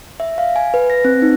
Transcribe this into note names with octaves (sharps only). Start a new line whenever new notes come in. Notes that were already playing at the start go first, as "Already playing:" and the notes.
E5
F5
G#5
B4
A#6
C4
D#4